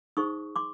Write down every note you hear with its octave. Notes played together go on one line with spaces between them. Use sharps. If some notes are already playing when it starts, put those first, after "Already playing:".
D#4 G#4 C5 C#6 D#6
C6 D6